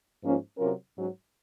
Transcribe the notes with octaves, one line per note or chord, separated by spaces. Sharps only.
G#2 F3 A#3 C#4 F4
C3 F#3 C#4 F4 A#4
G#2 F#3 C#4 F#4